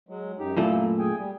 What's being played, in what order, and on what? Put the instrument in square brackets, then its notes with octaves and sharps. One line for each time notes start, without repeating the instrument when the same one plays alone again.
[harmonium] F#3 G#3
F#2 D#4 G4
[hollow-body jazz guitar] F#2 A#2 A3 [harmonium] A#3 E4
[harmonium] G#4 G5 G#5
G3